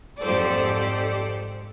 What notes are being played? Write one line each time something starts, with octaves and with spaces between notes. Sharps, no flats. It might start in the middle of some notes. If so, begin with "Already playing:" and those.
F2 G#2 G4 A4 C5 D5